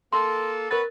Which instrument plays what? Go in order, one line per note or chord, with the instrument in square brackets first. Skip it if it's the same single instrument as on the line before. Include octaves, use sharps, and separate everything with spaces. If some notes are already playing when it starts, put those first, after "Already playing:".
[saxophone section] A#3 A4 [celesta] C6
[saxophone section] B3 C#4 B4 [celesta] A#4 A6